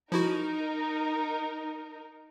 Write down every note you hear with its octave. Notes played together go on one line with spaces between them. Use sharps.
F3 D#4 E4 F#4 A#4